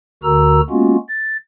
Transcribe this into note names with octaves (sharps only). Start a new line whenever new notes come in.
D2 D3 F#4 A#4 A#5 E6
G#3 A#3 B3 C#4 F4 F#4
A6